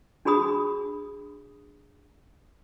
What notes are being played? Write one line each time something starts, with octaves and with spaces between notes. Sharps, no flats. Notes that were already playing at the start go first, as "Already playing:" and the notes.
D4 F#4 G#4 B5 D#6